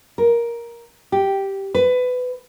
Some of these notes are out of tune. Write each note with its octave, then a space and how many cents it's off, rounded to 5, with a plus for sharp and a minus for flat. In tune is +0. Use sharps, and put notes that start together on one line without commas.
A#4 +10
G4 -5
B4 +20